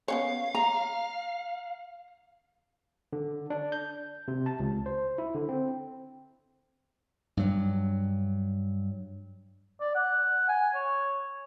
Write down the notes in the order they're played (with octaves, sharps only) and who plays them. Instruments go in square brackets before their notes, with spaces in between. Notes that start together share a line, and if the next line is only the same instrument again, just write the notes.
[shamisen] B3 C#4 C#5 [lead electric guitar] F5
[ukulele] A#5
[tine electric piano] D3
D4
G6
C3
A5
C#2
C5
E4
D3
C4
[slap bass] G2 F#3
[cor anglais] D5
F#5
G#5
C#5